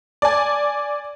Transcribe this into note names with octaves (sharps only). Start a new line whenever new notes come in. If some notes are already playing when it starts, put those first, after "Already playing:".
D5 G#5